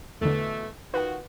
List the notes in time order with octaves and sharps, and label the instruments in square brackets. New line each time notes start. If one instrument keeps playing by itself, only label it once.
[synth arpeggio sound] E2 D3 [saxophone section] B2 E3 A3
[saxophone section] D#3 F4 F#4 [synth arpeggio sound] B4 F#5